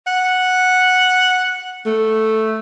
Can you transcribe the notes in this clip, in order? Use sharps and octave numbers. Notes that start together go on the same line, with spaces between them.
F#5
A3